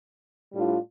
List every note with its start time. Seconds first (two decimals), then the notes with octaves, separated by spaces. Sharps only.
0.53 A2 G3 D4 F4